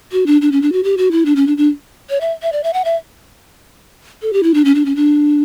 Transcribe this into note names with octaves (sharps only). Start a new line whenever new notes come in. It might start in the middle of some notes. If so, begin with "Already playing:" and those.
F#4
D4
D4
C#4
D4
F#4
G4
F#4
E4
D4
C#4
D4
D4
C#5
E5
E5
D5
E5
F#5
E5
A4
G4
E4
D4
C#4
D4
C#4
D4